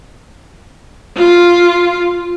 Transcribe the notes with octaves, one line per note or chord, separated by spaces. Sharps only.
F4